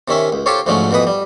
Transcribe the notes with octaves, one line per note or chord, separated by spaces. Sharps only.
C3 D#3 C#4 E5
C#2
F4 G4 A4 C5 C#5
D2 G#2 F3 F#3 A3 C#4
F2 B2 E3 B4 D#6
G3